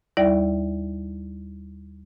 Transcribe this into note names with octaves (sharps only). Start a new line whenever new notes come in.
D#2 G3 E4 D5 E5